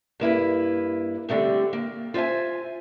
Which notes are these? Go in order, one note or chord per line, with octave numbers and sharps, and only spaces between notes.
G2 A#3 E4 B4
D3 G3 A3 C4
A#3
F4 C5 C#5 E5 G#5